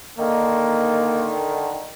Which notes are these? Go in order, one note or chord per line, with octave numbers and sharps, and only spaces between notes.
D3 D#3 A#3